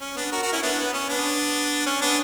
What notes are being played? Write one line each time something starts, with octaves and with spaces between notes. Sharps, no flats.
C#4
B3 D4
F#4 A#4
F#4 A#4
C#4 E4
B3 D4
B3
C#4
B3 D4
C#4
B3 D4